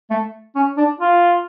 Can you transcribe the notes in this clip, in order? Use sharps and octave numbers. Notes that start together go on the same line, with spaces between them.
A3
C#4
D4
F4